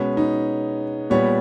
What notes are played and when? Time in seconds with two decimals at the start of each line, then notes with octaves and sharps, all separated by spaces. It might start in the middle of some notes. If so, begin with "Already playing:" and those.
Already playing: B2 G#3 B3 C#4
0.17 D#4
1.10 A#2 G3 B3 C#5